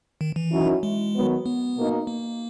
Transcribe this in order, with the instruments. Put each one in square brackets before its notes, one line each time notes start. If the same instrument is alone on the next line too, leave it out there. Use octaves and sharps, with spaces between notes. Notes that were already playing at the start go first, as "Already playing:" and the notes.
[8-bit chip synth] D#3
E3
[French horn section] F#2 D#3 F#3 C#4 E4
[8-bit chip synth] G#3
[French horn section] D#3 F#3 B3
[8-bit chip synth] B3
[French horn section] B2 A#3 D#4
[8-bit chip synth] A#3